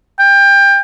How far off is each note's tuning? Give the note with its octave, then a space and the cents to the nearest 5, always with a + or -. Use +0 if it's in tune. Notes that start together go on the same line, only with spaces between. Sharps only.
G5 +25